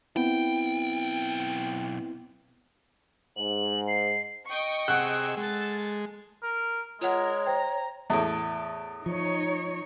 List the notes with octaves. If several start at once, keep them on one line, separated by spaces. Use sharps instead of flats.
B1 B3 C4 E4 G5
G#2 F#7
C7
D#5 G5 C#6
C3 G#4 F#5 E6 F#6
G#3 A4 A6
A#4
G#3 F4 A#4 C#5 F#5
C5 G5 A#5
E2 A2
F3 D#4 C#5